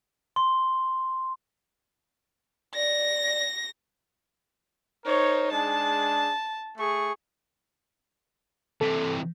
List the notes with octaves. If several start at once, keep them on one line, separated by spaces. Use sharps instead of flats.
C6
D5 A#6
D#4 A#4 C5 C#5
G#3 D4 G#4 A5
A3 G#4 C#6
C3 E3 A4